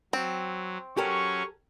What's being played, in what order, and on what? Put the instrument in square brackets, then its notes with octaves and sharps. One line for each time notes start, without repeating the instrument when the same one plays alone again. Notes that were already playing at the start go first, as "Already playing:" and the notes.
[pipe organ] F#3 [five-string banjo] C4
[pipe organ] F#3 C#4 [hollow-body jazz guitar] G4 A4 A#4 [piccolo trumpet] C#6